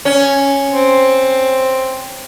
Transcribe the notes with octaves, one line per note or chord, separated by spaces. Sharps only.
C#4
C4